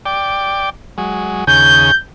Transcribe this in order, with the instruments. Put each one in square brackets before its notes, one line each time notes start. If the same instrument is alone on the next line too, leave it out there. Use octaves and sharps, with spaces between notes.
[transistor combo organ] D5 G5
F#3 G#3
[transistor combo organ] D#2 C#3 G#4 [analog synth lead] G6